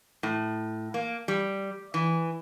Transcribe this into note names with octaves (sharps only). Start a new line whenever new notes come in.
A2
A#3
G3
E3